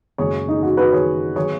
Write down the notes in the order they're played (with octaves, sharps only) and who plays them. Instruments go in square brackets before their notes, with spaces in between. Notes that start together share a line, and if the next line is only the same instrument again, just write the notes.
[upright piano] F#1 F#2 C#3 G#3 G#4 C#5
D#4 G#4
F#4
F#4 B4
G#4 C#5
F#3 B3 G#4 C#5